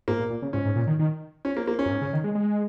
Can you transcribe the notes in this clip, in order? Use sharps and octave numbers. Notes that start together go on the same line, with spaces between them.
G#2 A#3
A#2
A#2
C#3
G#2 C#4
G#2
A#2
D#3
D#3
C#4
A#3
A#3
C#4
F#2
G#2
C#3
D#3
G#3
G#3